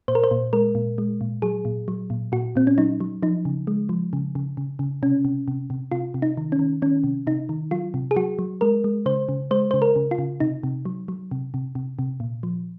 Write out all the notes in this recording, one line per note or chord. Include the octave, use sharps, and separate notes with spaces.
A#2 C5
A#4
C5
A#2
G#3 A#4
A#2
G#3
A#2
F#3 G#4
A#2
F#3
A#2
A#2 F#4
A#2 C4
C#4
F#3 D#4
F#3
F3 D#4
C#3
G#3
F3
C#3
C#3
C#3
C#3
C3 C#4
C3
C3
C3
C3 F4
C3
D#4
D#3
C#4
D#3
D#3 C#4
C3
C3 D#4
D#3
F#3 F4
C3
G#4
F#3 F#4
F#3
G#3 A#4
G#3
C#3 C5
C#3
G#3 C5
C5
C#3
A#4
C#3
F4
C#3
C3 D#4
C3
F#3
F#3
C3
C3
C3
C3
A#2
F3